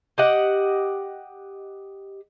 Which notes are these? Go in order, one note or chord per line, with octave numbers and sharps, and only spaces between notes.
G4 D#5 F#5